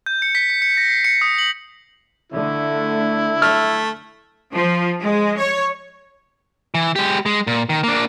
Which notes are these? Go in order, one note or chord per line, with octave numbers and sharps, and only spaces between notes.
G6
C#7
B6
C#7
C#7
A#6
C7
C#7
D#6
F#7
D3 A3 E4
A3 F6
F3
G#3
C#5
E3
G#3 G4
G#3
A#2
D#3
A#3 D4